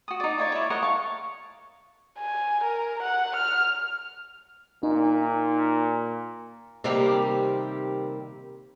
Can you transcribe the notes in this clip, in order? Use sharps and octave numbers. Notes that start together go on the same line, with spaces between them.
F#4 D#6
D#4 D5
F4 C#5 D5
E4 C#5
A#4 C#5 D#5 F#5
F5 A5 C#6
G#5
A#4
F#5
F6
A#2 D#4
C3 D#3 G3 A#3 C4 G4